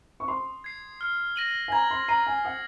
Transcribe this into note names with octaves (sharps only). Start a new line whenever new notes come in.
C#6
C6 D#6
G#6 C7
F6
A#6 D#7 F#7
G#5
A#5 G#6
C6
A#5 C7 D#7 F#7
G#5
F#5 D#6